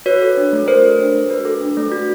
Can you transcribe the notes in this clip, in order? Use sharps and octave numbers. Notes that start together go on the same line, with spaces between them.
F#4 B4 C#5
A4
D4
A3
F#4 A#4 C5
A4
D4
A3
F#4 B4
A4
D4
A3
F#4